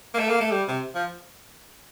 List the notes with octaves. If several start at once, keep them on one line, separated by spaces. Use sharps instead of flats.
A#3
A3
A#3
A3
G3
C3
F3